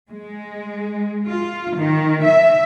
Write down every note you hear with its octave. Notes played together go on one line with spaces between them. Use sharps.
G#3
F4
D#3
E5